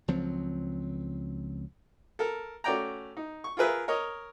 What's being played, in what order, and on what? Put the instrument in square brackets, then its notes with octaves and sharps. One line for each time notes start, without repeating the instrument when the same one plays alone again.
[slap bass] C#2 F3 F#3 C4
[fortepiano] A4 A#4
A3 C#4 F#4 D5 G5 A#5
D#4
C#6
F4 G#4 A#4 B4 E5
A#4 C#5 D#5